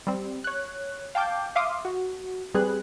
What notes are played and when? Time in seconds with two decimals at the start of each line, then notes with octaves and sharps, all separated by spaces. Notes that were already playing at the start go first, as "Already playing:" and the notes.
0.07 G3 C4
0.44 C#5 F#6
1.15 F5 G5 A5 D6 G6
1.56 E5 F5 C6 D6 D#6
1.85 F#4
2.54 G3 C4 G#4 B4 F#6